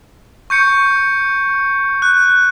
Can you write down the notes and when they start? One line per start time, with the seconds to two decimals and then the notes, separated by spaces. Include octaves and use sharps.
0.50 C#6 G6 C#7
2.02 F#6